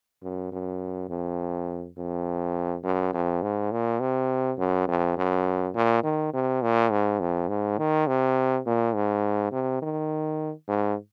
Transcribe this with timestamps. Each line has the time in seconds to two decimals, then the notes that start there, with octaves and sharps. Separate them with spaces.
0.23 F#2
0.52 F#2
1.09 F2
1.98 F2
2.84 F#2
3.14 F2
3.42 G#2
3.72 A#2
4.00 C3
4.58 F#2
4.88 F2
5.17 F#2
5.75 A#2
6.03 D#3
6.33 C3
6.62 A#2
6.91 G#2
7.20 F2
7.49 G#2
7.78 D#3
8.07 C3
8.66 A#2
8.95 G#2
9.52 C3
9.82 D#3
10.69 G#2